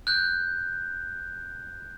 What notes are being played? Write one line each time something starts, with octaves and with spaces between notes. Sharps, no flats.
F#6 G6